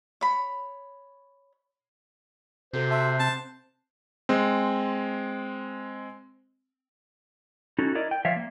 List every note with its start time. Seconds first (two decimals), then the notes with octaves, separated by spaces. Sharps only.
0.21 C#5 B5
2.73 C3 F#4 A4 C5
2.91 E5 A5 C6 F#6
3.20 C4 A5
4.29 G#3 C4
7.79 C#4 D#4 E4 F#4 A4
7.95 E4 A#4 D5 D#5
8.11 G5
8.25 F3 C#5 D5 E5 F5
8.36 A#3